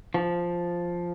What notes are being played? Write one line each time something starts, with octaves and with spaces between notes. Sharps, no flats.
F3